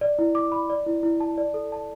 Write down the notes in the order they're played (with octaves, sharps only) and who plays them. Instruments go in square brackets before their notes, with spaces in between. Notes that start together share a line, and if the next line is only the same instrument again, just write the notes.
[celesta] D5
E4
D6
B5
D5
E4
E4
A5
D5
A4
A5